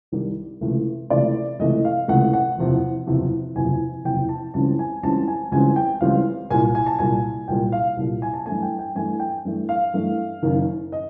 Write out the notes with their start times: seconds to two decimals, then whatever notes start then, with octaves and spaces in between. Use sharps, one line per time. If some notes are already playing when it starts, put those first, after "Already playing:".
0.12 C2 C3 D#3 G3
0.61 C#2 C3 E3 A3
1.10 C#2 C3 E3 A3 D5
1.59 C#2 C3 E3 A3 D#5
1.85 F5
2.08 C#2 C3 E3 A3 F#5
2.33 F#5
2.58 F#1 E2 C3 F3
3.07 F#1 E2 C3 F3
3.55 F#1 E2 C3 F3 G#5
4.05 F#1 E2 C3 F3 G5
4.29 A5
4.54 C#2 C#3 E3 G3 C4 A5
4.79 G#5
5.03 C#2 C#3 E3 G3 C4 A5
5.28 G#5
5.51 C#2 C#3 E3 G3 C4 G#5
5.76 G5
6.01 C#2 C#3 E3 G3 C4 F5
6.50 C2 A#2 G3 G#5
6.75 G#5
6.86 A5
6.99 C2 A#2 G3 G#5
7.48 C2 A#2 G3 G5
7.72 F5
7.97 C2 A#2 G3
8.22 G#5
8.34 A5
8.46 G2 E3 A3 G#5
8.62 G5
8.79 G5
8.95 G2 E3 A3 G#5
9.19 G5
9.45 G2 E3 A3
9.69 F5
9.93 G2 E3 A3
10.42 F#1 F#2 D#3
10.92 D#5